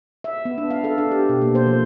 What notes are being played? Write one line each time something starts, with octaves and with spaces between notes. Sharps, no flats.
E5
B3
D4
F5
A4
D4
G4
B2
A#3
C5
F3